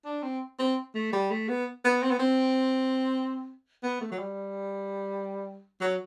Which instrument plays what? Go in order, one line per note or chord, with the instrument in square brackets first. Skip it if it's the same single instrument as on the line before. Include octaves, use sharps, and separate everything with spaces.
[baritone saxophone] D4
C4
C4
A3
G3
A3
B3
B3
C4
B3
C4
B3
A3
F#3
G3
F#3